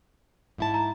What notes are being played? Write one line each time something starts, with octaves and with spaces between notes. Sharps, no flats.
G#2 E4 A5
A#5